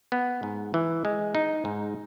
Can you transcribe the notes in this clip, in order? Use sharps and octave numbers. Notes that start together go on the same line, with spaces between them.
B3
G#2
E3
G#3
D#4
G#2